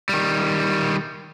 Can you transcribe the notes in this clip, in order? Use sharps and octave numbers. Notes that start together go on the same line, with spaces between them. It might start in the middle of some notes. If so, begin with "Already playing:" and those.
D#3 G3